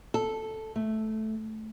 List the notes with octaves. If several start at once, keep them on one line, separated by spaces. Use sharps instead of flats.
A4
A3